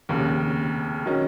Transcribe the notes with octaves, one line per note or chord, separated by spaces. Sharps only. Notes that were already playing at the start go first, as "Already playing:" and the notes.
F1 D#2 C#3
D#3 F#3 C#4